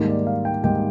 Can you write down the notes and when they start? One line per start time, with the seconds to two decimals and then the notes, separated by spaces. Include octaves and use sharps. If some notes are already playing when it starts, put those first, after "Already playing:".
Already playing: G#2 D#3 G3 A#3
0.08 D5
0.27 F5
0.45 G5
0.63 G#2 D#3 G3 A#3 G5